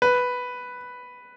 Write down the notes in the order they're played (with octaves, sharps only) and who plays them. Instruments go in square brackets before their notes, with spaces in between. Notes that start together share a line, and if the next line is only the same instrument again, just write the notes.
[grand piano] B4